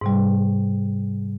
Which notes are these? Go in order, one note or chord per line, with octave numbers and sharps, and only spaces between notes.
G#2 C3 G3